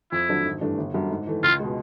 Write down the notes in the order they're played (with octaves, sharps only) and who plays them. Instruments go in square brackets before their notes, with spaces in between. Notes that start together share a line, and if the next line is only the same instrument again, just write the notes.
[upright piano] F2 [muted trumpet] E4
[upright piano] D3 F#3 A3 D4
G#1
G2 E3 A3 D4
G1
F#2 D3 G3
G#2
E3 A3
[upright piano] C#2 [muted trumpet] F4
[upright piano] B2 G#3